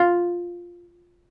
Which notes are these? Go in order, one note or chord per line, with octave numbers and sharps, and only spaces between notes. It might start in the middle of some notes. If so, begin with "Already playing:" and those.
Already playing: F4